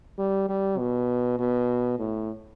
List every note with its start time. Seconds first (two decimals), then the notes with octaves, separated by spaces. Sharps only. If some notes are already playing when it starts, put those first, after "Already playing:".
0.18 G3
0.49 G3
0.78 B2
1.39 B2
1.99 A2